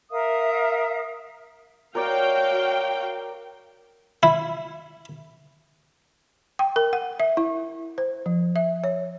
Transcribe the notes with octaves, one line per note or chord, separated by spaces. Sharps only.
A#4 E5 F5 D#6
F#4 A#4 C#5 D5 F5 G5
E4
G5
A#4
F#5
E5
E4
C5
F3
E5
C#5